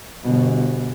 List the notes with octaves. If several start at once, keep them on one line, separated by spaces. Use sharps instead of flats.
G1 B2